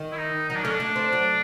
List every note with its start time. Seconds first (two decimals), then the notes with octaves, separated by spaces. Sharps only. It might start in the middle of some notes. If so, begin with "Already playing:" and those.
Already playing: D#3
0.12 E4
0.17 D#4
0.49 F#3 D#4
0.56 D4
0.64 A3 C#4
0.71 D4
0.80 A3
0.96 C4
1.13 F#3